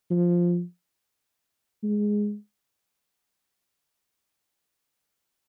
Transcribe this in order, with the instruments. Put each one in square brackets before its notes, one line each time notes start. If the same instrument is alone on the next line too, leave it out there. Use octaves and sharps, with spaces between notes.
[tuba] F3
G#3